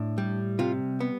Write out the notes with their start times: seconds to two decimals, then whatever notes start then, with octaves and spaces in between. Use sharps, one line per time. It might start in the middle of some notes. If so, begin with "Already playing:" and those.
Already playing: A2 D4
0.18 G3
0.59 C3 F4
1.00 B3